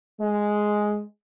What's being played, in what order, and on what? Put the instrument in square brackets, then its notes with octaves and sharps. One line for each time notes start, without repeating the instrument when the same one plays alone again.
[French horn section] G#3